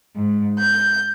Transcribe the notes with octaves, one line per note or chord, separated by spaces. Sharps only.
G#2
G6